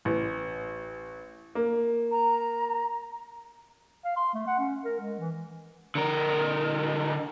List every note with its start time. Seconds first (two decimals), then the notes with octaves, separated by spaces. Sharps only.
0.05 A1
1.55 A#3
2.11 A#5
4.05 F5
4.16 C6
4.34 A3
4.47 F#5
4.59 C#4
4.85 A#4
5.00 G#3
5.19 E3
5.95 D3 A#4